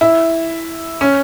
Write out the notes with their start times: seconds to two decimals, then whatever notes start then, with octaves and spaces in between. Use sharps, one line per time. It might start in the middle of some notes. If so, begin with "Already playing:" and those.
0.01 E4
1.01 C#4